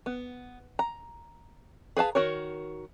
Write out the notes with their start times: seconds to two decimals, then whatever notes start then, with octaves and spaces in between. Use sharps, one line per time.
0.06 B3
0.79 A#5
1.97 G#4 B4 F5 A5
2.15 D#3 F#4 A#4 C#5